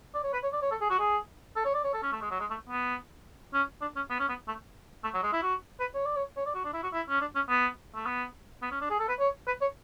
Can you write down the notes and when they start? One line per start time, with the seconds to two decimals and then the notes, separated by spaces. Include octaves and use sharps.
0.15 D5
0.24 C#5
0.33 B4
0.43 C#5
0.53 D5
0.62 C#5
0.71 A4
0.81 G#4
0.90 F#4
0.99 G#4
1.56 A4
1.65 C#5
1.74 D5
1.84 C#5
1.94 A4
2.03 C#4
2.12 A3
2.22 G#3
2.31 F#3
2.40 G#3
2.50 A3
2.69 B3
3.53 C#4
3.81 D4
3.96 C#4
4.10 B3
4.19 C#4
4.29 B3
4.48 A3
5.04 A3
5.14 F#3
5.23 G#3
5.33 E4
5.43 F#4
5.80 B4
5.94 C#5
6.05 D5
6.17 C#5
6.37 C#5
6.46 D5
6.55 F#4
6.64 D4
6.74 E4
6.83 F#4
6.93 E4
7.09 C#4
7.21 D4
7.35 C#4
7.49 B3
7.95 A3
8.06 B3
8.62 B3
8.71 C#4
8.81 D4
8.90 G#4
8.99 A4
9.09 B4
9.19 C#5
9.47 B4
9.61 C#5